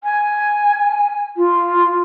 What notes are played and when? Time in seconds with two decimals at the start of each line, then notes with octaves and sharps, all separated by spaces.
0.03 G#5
1.36 F4